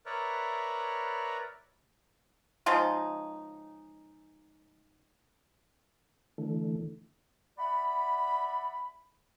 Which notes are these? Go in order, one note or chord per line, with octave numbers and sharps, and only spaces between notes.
A#4 B4 C#5 D5 E5 A#5
C#3 F3 G#3 D#4
D3 E3 A3
D5 E5 F#5 B5